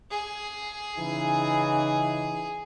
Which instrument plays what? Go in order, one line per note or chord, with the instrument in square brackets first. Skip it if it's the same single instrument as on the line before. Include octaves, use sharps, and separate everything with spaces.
[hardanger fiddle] G#4
[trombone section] C#3 E3 D#4